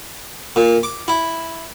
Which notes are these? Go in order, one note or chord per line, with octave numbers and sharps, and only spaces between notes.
A#2
D6
E4